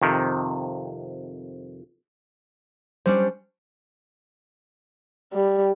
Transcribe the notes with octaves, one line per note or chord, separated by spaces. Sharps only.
F2 C3 D#3
G3 C#4 D4 C5
G3